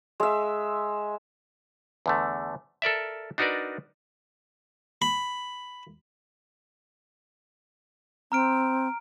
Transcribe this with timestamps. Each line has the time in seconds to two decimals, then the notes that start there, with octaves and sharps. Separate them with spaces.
0.20 G#3 E5
2.06 E2 D3 A3
2.82 A4 A#4 D5 E5
3.38 D4 D#4 F#4 A#4 B4 D5
5.02 B5
8.32 C4 A#5 F6 D7